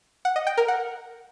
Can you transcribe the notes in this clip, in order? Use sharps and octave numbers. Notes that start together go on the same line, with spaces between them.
F#5
D#5
G5
A#4
F#5